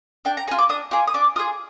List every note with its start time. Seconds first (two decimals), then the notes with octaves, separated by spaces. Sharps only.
0.25 D4 G5
0.37 A#5
0.48 G#4 A#5
0.51 F4
0.58 D6
0.69 D4 D#6
0.91 F4 G#4 D6
1.07 D#6
1.14 D4 D6
1.36 F4 D#6
1.39 G#4